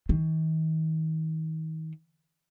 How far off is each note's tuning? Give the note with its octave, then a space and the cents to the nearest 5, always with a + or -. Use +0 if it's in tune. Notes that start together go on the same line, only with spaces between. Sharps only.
D#3 +40